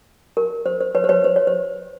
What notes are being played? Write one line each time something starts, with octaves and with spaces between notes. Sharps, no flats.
A#4
C5
C5
B4 C#5
C5
B4 C#5
C5
C#5
C5